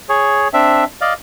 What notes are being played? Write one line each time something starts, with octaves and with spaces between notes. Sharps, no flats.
G#4 C#5
C4 D4 E5
D5 D#5 F5